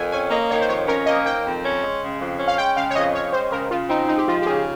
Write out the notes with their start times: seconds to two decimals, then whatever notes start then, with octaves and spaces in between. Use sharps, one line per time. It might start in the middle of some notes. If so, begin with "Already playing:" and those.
Already playing: F2 A#4 G5 G#5
0.12 C#4 G#5
0.31 A#3 D#5
0.49 D#3 C#5
0.61 C5
0.69 F2 C#5
0.87 C#4 A#4
1.06 A#3 D#5
1.25 D#3 G5
1.45 F2
1.63 C#4
1.82 G#3
2.01 C#3
2.20 F2
2.39 C#4
2.48 F5
2.58 G#3 G5
2.76 C#3 F5
2.90 C#5
2.95 F2 D#5
3.14 C#4 C#5
3.33 G#3 C5
3.52 C#3 A#4
3.71 C#3 F4
3.90 C4 D#4
4.08 G#3 D#4
4.18 G4
4.27 F3 F4
4.42 G4
4.46 C#3 G#4